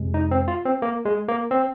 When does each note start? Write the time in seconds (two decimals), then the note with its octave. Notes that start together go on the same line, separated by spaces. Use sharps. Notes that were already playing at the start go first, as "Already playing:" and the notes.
Already playing: F2 C3 G#3
0.14 D#4
0.31 C4
0.48 F4
0.65 C4
0.82 A#3
1.05 G#3
1.28 A#3
1.51 C4